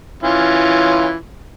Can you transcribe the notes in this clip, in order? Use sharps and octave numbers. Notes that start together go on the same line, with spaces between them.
E3 C#4 F4